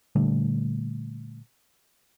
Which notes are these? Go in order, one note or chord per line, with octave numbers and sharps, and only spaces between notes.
A#2 D3 G3 A3